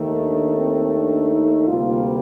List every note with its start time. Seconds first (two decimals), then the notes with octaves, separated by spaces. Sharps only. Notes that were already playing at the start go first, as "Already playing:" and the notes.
Already playing: D#2 D#3 A3
0.19 D4
0.56 C4
0.93 D4
1.30 D#4
1.66 D2 C3 G3 A#3 F4